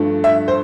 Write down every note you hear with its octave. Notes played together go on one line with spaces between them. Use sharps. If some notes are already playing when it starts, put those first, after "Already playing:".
Already playing: G2 F3 A3
E5
C5